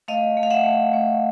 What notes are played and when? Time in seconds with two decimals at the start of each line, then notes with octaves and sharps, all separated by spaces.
0.08 A3 D#5 F5
0.37 A3
0.43 F5
0.50 E5 F#5
0.65 A3
0.93 A3